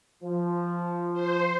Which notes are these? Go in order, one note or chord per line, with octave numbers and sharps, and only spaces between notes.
F3
C5